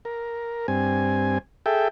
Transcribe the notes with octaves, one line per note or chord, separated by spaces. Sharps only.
A#4
G2 C4 G#5
G#4 A4 E5 G5